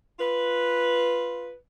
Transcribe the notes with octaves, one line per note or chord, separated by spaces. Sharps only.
F4 B4